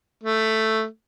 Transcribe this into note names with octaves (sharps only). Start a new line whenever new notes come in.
A3